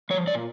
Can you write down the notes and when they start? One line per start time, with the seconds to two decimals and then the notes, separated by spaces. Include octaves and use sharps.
0.10 F3 C#5
0.27 A#2 D5